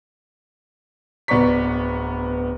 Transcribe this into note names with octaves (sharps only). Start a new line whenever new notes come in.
D1 B3 D5 A#5 C#6 B6